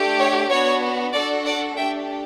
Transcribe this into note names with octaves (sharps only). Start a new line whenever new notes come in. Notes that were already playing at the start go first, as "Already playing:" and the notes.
Already playing: A3 D4 G4
C#5
B3 D4 F#4 C#5
D4 F#4 A4 D5
D5 F#5
A3 D4 G4 E5 G5